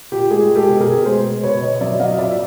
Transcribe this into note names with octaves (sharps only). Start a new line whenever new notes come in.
A#2 G4
G#3 G#4
G#3
G4 A4
B2
G#4 A#4
B2
G#3 A#4 C5
G#3
B2 B4 C#5
B2 C#5 D#5
D#5
F#3 D5 E5
F#3 D#5 F5
A#2 D5 E5
E5